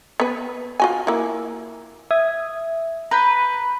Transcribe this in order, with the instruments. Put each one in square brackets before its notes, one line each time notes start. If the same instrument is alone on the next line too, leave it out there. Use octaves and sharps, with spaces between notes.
[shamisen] B3 B4
F4 F#4 G#5
A#3 E4
[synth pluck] E5 D#6 G#6
[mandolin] B4 [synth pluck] A#5 G6 B6